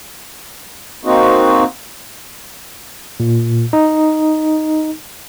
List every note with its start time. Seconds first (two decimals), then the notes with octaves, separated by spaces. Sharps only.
1.05 A#3 C4 D#4 F#4
3.20 A#2
3.73 D#4